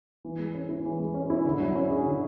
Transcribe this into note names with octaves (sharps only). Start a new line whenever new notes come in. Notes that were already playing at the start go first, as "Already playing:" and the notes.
E3
G#3
C#4
E4
E3
G#3
C#4
E4
D3
F#3
C#4
G#4
D3